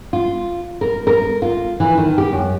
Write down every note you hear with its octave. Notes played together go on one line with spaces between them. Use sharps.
F4
A#4
A#4
F4
E3
D#3
G4
F#2